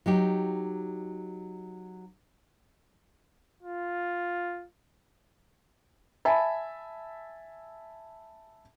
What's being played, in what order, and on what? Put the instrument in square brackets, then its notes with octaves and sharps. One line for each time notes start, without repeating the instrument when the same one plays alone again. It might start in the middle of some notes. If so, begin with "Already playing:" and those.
[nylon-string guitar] F#3 D#4 G4
[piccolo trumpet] F4
[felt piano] E5 G#5 A5 B5